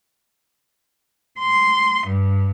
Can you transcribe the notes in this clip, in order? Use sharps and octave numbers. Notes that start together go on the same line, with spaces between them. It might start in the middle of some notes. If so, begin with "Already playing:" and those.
C6
G2